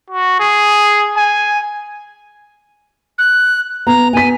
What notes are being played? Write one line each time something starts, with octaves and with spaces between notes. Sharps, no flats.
F#4
G#4
G#5
F#6
B3 A#5
B3 G#5 B6